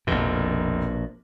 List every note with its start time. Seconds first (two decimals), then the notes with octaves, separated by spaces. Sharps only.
0.07 F1 A#1 B2